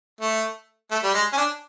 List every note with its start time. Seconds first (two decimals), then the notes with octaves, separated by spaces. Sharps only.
0.21 A3
0.91 A3
1.03 G3
1.14 G#3
1.33 C#4
1.37 D4